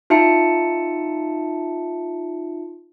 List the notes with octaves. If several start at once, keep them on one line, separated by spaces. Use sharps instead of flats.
D#4 F4 E5 A5 C#7